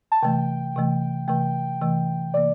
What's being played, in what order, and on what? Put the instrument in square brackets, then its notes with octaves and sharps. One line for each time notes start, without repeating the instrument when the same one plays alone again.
[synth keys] A5
[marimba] C3 E3 A3 [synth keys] G5
[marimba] C3 E3 A3
[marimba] C3 E3 A3 [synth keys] G5
[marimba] C3 E3 A3
[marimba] C3 E3 A#3 [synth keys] D5